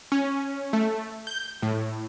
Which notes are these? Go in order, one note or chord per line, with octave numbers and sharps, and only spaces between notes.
C#4
A3
G6
A2